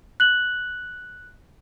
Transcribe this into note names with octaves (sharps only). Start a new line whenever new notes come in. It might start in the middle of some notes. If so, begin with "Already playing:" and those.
F#6 F#7